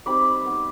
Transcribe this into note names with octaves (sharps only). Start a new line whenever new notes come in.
G3 C4 D#4 B5 D6
B3 D#4